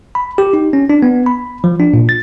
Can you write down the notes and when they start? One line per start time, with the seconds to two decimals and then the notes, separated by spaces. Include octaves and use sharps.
0.15 B5
0.38 G4
0.53 D#4
0.73 C#4
0.90 D4
1.03 B3
1.26 B5
1.64 F3
1.80 D4
1.94 A#2
2.09 A6